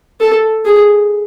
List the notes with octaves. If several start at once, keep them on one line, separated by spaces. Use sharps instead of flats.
A4
G#4